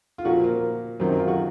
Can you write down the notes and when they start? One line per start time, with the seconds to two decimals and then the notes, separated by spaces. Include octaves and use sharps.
0.18 F4
0.25 A#2 F3 F#4
0.44 A#3
1.00 F#2 D#3 F#3 C4
1.09 D#4
1.19 F4
1.28 F#4